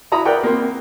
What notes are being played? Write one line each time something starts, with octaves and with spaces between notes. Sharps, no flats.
E4 F#4 A#5 B5 D#6
A#4 B4 D5 F#5 G5
A#3 C4